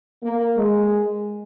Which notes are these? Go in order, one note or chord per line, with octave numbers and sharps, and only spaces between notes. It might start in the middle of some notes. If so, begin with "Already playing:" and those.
A#3
G#3